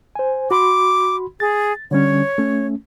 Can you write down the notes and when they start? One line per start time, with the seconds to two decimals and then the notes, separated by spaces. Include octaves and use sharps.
0.15 C5 G#5
0.51 F#4 B5 C6 D6
1.40 G#4 A6
1.91 D3 G3 C#4 C#5
2.38 A3 C#4